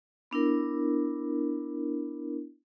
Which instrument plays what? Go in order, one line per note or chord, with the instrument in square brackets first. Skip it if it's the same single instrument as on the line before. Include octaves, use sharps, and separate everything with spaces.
[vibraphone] B3 D4 E4 A#4